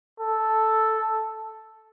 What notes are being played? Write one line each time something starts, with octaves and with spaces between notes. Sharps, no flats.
A4